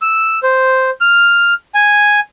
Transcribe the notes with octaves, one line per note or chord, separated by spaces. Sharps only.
E6
C5
F6
G#5